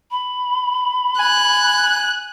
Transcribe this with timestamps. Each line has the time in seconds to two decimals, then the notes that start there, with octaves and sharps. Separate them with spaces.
0.11 B5
1.19 G#5 F#6